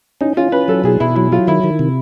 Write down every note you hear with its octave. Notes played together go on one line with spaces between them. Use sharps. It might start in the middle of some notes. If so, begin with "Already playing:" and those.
C#4 D#4
C#4 F4
C#4 B4
F#3 A4
B2 G#4
B2 E4
F#3 E4
F#3 F4
D#3 E4
D#3
C3